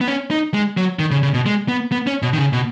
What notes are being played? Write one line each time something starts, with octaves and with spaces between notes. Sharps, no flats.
B3
C#4
D#4
G#3
F#3
D#3
C#3
C#3
B2
G#3
B3
B3
C#4
B2
D#3
C#3
B2